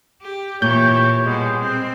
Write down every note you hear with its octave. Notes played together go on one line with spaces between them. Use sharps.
G4
A#2 E3 G4 C#5 G6
B2 G3 G#3
C4